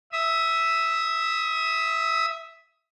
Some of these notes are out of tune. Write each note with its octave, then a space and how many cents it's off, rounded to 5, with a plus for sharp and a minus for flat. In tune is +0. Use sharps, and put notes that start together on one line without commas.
E5 +0 D#6 +30